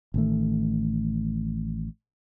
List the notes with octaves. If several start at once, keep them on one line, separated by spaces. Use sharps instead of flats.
A1 D#3 A3